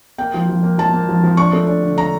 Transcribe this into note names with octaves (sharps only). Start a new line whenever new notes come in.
A#3 G5
F3
F3
A#3
F3 A5
A#3
F3
F3
D4 C#6
A3
D4
D3
D3 A#5